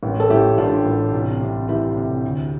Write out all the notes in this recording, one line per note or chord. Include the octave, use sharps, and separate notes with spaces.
A1
A4
A1 E4 G4
A1 D4 F4
A1
C2
C3
E3 E4 G4
C3
D2